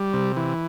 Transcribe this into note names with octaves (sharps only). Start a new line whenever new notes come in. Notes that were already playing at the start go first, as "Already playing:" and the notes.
Already playing: G3
C3
E3